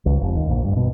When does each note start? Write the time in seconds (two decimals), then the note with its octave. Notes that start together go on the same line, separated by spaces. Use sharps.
0.06 C#2
0.21 F1
0.36 D#2
0.49 A#1
0.64 G2
0.77 B2